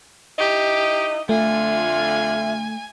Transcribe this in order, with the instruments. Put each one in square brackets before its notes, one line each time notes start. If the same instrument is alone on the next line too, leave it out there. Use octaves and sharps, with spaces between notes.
[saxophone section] D#4 E4 D#5 [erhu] G4
[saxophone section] F2 D3 F4 [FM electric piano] A3 [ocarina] E5 [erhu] G#5